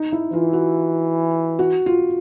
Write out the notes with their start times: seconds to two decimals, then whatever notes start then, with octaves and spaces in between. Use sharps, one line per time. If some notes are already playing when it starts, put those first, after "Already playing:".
Already playing: D#4
0.12 E4
0.32 E3 F4
0.53 F#4
1.59 F#4
1.86 F4